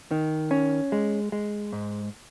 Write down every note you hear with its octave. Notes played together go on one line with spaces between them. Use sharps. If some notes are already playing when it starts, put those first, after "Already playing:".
D#3
C#4
G#3
G#3
G#2